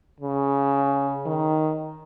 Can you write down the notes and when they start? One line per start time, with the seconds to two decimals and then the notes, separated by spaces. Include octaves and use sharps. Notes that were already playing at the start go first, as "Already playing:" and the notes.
0.20 C#3
1.26 D#3